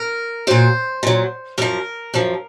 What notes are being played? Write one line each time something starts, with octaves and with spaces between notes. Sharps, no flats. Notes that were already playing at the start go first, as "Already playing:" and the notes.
Already playing: A#4
A#2 F#3 C5
A#2 F#3
F#2 F3 A#4
F#2 F3